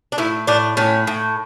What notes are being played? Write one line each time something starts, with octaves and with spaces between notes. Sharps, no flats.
D4
A2 E4
A2 D4
A2 C#4
A2